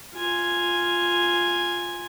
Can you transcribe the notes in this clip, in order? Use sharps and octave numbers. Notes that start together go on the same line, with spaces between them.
F4 G#5